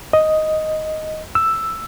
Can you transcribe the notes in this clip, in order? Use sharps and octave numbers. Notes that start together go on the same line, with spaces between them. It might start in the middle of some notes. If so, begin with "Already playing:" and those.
D#5
E6